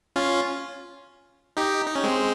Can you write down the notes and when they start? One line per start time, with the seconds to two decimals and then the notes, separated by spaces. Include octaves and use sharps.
0.16 C#4 F4
1.57 D#4 G4
1.86 D#4
1.95 C#4
2.04 G#3 C4